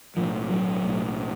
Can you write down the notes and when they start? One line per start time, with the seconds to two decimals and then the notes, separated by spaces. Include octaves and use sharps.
0.17 B1 A2 F3
0.50 F#3
0.83 B1 A2